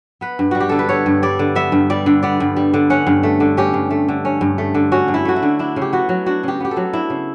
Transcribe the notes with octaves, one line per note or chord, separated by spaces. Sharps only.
B3 B4
G2
G3 F#4
G4
D3 A4
B4
B3 C#5
G2
G3 D5
D3
B3 E5
G2
G3 D5
D3
B3 D5
G2
G3
D3
C#4 F#5
G2
A3
D3
C#4 G4
G2
A3
D3
C#4
G2
A3
D3
C#4 F#4
G2
E4
A3 F#4
E4
D3
D4 E4
C#3
G4
B3 F#4
F#3
D4 F#4
C#3 G4
B3 G4
A4
F#3
D4 E4
C#3